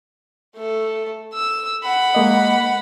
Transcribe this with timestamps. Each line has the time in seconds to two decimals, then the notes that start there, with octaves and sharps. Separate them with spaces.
0.56 A3 A4
1.34 E6
1.84 F#5 B5
2.15 G#3 A#3 D#5